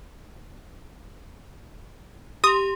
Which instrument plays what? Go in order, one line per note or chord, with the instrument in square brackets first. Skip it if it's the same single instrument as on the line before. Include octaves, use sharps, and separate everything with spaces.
[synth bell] G4 C6 [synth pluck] D#6